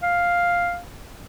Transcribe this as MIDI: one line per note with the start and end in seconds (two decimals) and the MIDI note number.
0.02 0.79 77